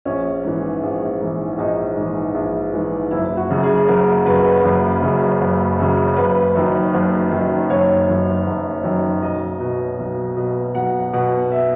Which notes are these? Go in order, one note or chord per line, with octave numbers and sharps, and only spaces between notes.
A#1 C#4
G#2 E3
A#1
G#2 E3
A#1 D#4
G#2 E3
A#1
G#2 E3
F#1 E4
F#4
F#2 C#3
G#4
F#1 A#4
F#2 C#3 B4
F#1
F#2 C#3
F#1
F#2 C#3
F#1 B4
F#2 D#3
F#1
F#2 D#3
F#1 C#5
F#2 D#3
F#1
F#2 D#3
B1 D#5
B2
B1
B2
B1 F#5
B2 F#5
E5